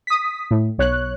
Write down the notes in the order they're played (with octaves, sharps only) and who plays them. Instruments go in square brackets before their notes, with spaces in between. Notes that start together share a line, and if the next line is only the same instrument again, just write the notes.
[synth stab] D#6 B6
A2
B1 C#5 F#6